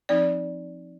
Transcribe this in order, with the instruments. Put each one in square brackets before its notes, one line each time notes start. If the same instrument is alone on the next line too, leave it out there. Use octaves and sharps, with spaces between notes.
[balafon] F3 C4 D#4 D5